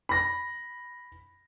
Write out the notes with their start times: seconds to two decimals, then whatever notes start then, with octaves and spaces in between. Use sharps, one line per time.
0.09 B5 A#6